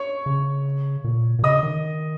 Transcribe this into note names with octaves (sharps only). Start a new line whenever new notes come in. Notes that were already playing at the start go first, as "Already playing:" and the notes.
Already playing: C#5 C#6
C#3
A#2
A#2
C#3 D#5 D#6
D#3